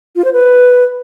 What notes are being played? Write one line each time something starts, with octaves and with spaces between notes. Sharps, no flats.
F4
C5
B4